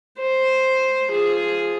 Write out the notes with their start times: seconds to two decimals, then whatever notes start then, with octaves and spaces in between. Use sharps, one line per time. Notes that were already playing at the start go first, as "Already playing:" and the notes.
0.20 C5
1.11 F3 G#4